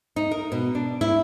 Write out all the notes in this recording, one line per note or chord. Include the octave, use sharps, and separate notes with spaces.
D#4
A#4
B2
D4
E4